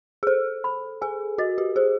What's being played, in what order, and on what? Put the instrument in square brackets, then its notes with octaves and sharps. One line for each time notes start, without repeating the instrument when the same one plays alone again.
[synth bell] G#4
[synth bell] A4 [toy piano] C5
[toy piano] B5
[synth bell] G#4 [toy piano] G#5
[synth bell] F#4 [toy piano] D#5
[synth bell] G4
[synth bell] G#4 [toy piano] C5